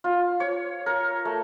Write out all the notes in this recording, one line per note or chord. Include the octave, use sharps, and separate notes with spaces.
F4
C#5
A#4
A3